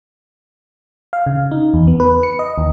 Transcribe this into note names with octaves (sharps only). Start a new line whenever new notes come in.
F5
C#3
D#4
E2
B3
B4
C#7
D#5
D#2